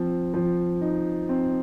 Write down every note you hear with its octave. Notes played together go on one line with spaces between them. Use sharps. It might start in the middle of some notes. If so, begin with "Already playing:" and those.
Already playing: F3 C4
F3
D#4
C4